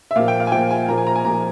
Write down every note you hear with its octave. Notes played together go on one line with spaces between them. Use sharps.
E5
A#2 F3 F5
G5
F5
G#5
A#2 F3 G5
G#5
A#2 F3 A#5
G#5
A#5
G#5
A#2 F3 A#5